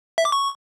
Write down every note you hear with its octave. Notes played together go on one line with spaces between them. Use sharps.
E5
D6
C#6